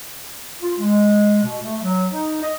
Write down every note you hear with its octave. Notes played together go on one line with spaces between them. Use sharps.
F4
G#3
B2
A3
F#3
D#4
D#5